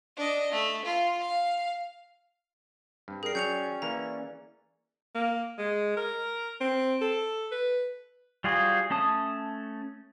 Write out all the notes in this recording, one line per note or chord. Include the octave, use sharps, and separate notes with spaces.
D4 D#5
A3
F4
F5
G2 C4
G#4 A#4 D5 G5 C7
F#3 C#4 G6 C#7 F7
E3 A#3 D5 A#5
A#3
G#3
A#4
C4
A4
B4
G3 F4 F#4 G#4 C5
A3 C#4 A5 D#6